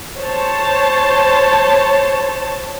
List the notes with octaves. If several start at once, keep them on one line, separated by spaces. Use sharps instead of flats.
C5 C#5 A5